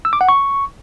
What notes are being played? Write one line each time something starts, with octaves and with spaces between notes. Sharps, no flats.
E6
D6
F#5
C#6